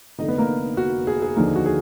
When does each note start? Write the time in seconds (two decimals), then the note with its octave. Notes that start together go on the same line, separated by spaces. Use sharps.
0.19 F1 F2 D3 D#4 D#5
0.28 B3 B4
0.38 A#3 A#4
0.77 F#4
1.07 G#4
1.22 G#4
1.36 D#2 D3 F3 A#3 D#4
1.56 F#4
1.66 G#4